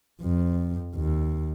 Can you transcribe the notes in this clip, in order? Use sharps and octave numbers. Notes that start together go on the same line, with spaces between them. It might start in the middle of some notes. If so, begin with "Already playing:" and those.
F2
D#2